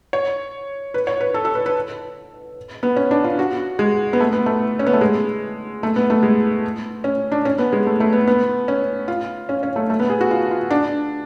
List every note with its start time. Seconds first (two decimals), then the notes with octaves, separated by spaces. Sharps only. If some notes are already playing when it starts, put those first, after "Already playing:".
0.13 C#5
0.94 B4
1.07 C#5
1.21 B4
1.34 A4
1.45 A4
1.55 B4
1.66 B4
2.83 B3
2.96 C#4
3.11 D4
3.24 F4
3.39 F#4
3.79 G#3
4.13 B3
4.20 A3
4.33 B3
4.46 A3
4.79 C#4
4.86 B3
4.93 A3
5.01 G#3
5.83 A3
5.96 B3
6.10 A3
6.23 G#3
7.04 C#4
7.32 D4
7.45 C#4
7.58 B3
7.72 G#3
7.87 A3
8.00 A3
8.13 B3
8.27 B3
8.68 C#4
9.08 F4
9.49 C#4
9.63 C#4
9.76 A3
9.90 A3
10.00 B3
10.10 G#4
10.21 F#4
10.31 F4
10.51 F4
10.71 D4